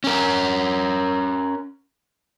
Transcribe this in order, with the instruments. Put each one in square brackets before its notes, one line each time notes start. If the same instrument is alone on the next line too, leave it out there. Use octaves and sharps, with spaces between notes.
[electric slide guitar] C#4 A#4